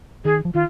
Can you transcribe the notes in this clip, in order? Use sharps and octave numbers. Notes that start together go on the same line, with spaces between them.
D#3 G#4
F3
D#3 F4